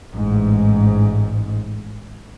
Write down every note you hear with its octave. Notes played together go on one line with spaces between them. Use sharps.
A1 G#2